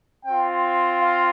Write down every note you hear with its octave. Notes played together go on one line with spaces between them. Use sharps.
C4 F4 G5
F5